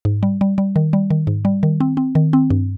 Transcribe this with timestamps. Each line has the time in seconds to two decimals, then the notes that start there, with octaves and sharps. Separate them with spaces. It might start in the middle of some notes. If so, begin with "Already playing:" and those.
0.05 G#2
0.23 G3
0.41 G3
0.58 G3
0.76 D#3
0.93 G3
1.10 D#3
1.27 G#2
1.45 G3
1.63 D#3
1.80 C4
1.97 C4
2.15 D#3
2.33 C4
2.50 G2